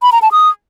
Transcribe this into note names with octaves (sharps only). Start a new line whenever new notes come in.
B5
A#5
A5
D#6